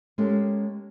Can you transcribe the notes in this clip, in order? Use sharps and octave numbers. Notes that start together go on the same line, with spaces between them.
G#3 A#3 C#4 G4 A4